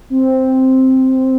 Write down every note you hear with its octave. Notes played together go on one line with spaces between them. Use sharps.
C4